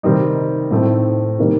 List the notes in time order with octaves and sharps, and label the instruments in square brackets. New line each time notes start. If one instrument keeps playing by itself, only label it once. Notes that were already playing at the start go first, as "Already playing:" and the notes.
[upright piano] C3 D#3 G3 C4 D#4
A2 A3 C4 D#4 A4
C3 D#3 G3 A#3 D#4